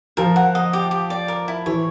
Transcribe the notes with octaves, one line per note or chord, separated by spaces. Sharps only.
F3 A#4
F#5
D#5
G4
G4
D5
A#4
E4
E3 C#5